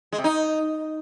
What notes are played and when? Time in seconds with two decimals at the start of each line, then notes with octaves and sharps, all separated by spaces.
0.13 G#3
0.18 C3
0.24 D#4